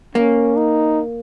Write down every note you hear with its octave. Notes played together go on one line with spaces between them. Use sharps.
A#3 C#4
D#4